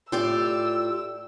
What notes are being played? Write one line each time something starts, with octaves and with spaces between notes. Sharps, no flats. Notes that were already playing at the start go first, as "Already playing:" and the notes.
A2 F4 G4 D5 E6